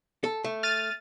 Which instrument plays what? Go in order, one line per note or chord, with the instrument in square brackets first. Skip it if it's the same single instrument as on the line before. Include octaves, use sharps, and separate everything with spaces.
[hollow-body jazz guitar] A4
A3
[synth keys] F6 A6 D#7